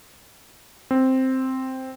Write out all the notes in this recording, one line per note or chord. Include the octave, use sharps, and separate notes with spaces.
C4